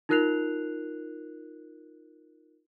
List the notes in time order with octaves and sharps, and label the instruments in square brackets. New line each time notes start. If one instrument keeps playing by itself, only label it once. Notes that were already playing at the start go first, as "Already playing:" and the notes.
[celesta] D#4 F4 A#4 F#6 C7 F7